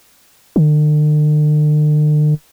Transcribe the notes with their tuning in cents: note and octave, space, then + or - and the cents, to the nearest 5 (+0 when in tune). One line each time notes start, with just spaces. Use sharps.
D3 +45